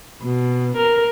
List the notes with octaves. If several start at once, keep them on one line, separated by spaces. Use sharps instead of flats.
B2
A#4